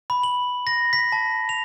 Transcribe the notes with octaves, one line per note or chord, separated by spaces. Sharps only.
B5
F#7
A#6
B6
A5
F7